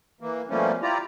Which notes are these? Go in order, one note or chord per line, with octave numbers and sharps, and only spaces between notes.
E3 A#3
B2 F3 G3 A3 A#3 C#4
E4 F4 G4 D5 A#5